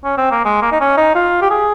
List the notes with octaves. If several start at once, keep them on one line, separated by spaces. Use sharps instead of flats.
C#4
C4
A#3
G#3
A#3
D#4
C#4
D#4
F4
G4
G#4